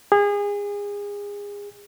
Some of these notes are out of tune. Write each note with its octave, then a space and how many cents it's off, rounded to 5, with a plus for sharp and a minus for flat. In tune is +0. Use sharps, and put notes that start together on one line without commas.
G#4 -30